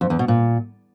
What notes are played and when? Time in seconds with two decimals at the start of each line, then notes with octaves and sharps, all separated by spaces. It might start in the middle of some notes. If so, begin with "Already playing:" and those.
0.01 F2
0.10 E2
0.19 B2
0.28 A#2